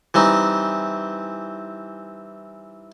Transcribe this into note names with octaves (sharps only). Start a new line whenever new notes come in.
E3 G3 C4 D#4